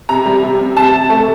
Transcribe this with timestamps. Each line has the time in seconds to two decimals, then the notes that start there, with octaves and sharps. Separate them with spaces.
0.09 C3 A#5
0.26 G3
0.43 C3
0.59 C3
0.77 C3 A5
0.94 C3
1.10 A3